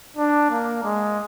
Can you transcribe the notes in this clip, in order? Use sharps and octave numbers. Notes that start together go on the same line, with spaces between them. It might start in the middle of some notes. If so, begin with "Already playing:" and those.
D4
A#3
G#3